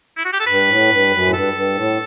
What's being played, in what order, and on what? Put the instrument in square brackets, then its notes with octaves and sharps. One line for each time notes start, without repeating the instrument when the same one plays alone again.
[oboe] E4
F#4
G4
A4
[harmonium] G2 [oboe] B4
[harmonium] A2
G2
F#2
A2
[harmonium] G2 [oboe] A4
[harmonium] G2
A2